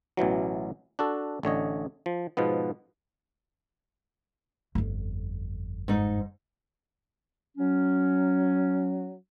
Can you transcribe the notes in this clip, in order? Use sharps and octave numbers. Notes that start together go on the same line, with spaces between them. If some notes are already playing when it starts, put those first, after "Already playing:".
A1 B2 E3 F#3
D4 F#4 A4
A1 D3 C#5 D#5
F3
G#2 B2 F3 B3
G1 F2
G#2 D#4
F#3 C#4